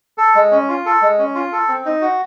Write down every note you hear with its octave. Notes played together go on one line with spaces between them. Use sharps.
A4
G#3
C#4
F4
A4
G#3
C#4
F4
A4
C4
D#4
F#4